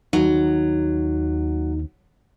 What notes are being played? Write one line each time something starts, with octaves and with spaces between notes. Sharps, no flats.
D#2 F#3 D#4